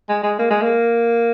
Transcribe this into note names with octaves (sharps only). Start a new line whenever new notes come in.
G#3
G#3
A#3
G#3
A#3